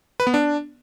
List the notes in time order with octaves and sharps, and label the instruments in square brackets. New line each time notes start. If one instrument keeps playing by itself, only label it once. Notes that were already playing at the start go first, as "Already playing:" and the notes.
[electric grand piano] B4
B3
D4